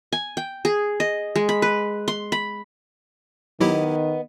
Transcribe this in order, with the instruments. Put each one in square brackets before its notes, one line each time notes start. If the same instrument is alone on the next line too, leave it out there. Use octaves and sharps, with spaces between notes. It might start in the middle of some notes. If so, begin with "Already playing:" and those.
[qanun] G#5
G5
G#4
D#5
G#3
B5
B4
C6
B5
[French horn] D#3 [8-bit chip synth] F#3 E4 G4 [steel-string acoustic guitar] B3 D#5